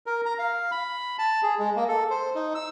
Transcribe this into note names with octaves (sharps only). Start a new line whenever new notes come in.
A#4
A#5
F5
B5
A5
G#4
G#3
A#3
A4
C5
D#4
E6